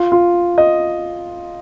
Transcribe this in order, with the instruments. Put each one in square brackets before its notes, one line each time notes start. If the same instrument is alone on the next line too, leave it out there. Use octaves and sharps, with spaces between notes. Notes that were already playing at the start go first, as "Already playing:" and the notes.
Already playing: [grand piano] F4
F4
D#5